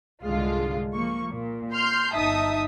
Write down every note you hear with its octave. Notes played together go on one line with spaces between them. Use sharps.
C2 G#2 D3 G#3 F4
F3 A#3 C#6
A#2
C6 F6 G6
G1 D#4 E5 A5 D#6